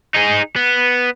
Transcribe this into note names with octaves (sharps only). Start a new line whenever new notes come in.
D#4 G#4
B3